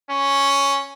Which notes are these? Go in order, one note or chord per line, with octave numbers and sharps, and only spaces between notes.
C#4